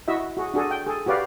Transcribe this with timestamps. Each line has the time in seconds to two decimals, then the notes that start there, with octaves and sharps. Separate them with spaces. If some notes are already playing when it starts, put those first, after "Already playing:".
0.08 E4 F#4 D#5 E5
0.37 F#4 G#4
0.54 D4 F#4 G#4 A4
0.71 G5
0.87 G#4 A4
1.07 F#4 G4 B4 D5 F5